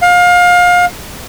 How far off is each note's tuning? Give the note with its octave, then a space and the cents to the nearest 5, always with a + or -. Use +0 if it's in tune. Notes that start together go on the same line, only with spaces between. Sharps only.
F5 +30